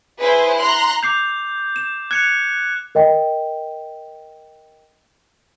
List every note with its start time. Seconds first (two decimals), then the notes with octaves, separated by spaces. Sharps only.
0.20 E4 G#4 B4 C5
0.58 A#5 C6 F#6
1.03 D6 G6 C7 F7
1.76 E7
2.11 F#6 G#6 C#7 F7
2.95 A#4 D#5 G5